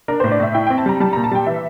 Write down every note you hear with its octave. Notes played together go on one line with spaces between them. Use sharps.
D4 A#4
C5
A2
D5
A2 E5
E4 G5
G5
C4
A5
G3 A#5
G3 A5
A#5
A#2
A5
G3 G5
E3 E5